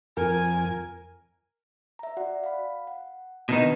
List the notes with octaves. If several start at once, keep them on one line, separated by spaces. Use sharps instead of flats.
F2 A#4 G#5
E5 A#5
F#4 D5 F#5
F5 B5
F#5
B2 D#3 D4 D#4 B4 F#5